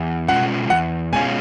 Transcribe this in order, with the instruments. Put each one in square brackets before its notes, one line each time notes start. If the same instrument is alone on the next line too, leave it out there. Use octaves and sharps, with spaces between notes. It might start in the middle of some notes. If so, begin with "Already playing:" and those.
Already playing: [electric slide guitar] E2
[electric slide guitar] B2 G#3 C#4 F4 [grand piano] F#5
[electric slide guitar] E2 [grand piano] F#5
[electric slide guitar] B2 G#3 C#4 F4 [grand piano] G#5